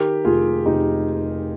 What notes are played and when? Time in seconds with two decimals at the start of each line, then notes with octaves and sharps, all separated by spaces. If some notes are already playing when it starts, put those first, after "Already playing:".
Already playing: D#3 G4 A#4
0.25 F1 F4 G#4
0.66 F1 D#4 G4